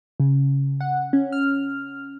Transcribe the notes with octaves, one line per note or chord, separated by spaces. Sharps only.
C#3
F#5
C#4
F6